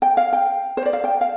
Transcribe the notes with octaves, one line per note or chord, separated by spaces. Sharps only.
G5
F5
G5
C5
D5
F5
G5
F5